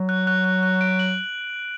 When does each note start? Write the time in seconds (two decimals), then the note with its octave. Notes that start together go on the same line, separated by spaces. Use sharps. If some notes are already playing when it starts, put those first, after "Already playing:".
Already playing: F#3
0.09 F#6
0.27 F#6
0.44 F#6
0.63 F#6
0.81 D7
0.99 F#7